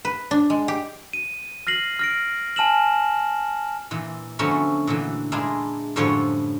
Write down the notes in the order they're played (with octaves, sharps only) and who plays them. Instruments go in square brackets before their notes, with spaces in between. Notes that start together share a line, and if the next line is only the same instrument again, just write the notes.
[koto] B4
D4
G#3
G4
[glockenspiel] D#7
F6 A#6 C7 F#7
F6 A#6 D7
G#5 A5 F6 E7 F#7
[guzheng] A#2 E3
D3 F3 F#3 A3 B3 C#4
A#2 D3 E3
G#3 A#3 D4 E4 F4 G#4
F#2 A2 D3 F3 G3 C#5